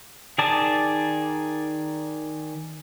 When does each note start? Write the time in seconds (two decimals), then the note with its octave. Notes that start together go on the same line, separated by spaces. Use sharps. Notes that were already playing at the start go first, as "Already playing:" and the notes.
0.38 D#3 G#4 D5 A5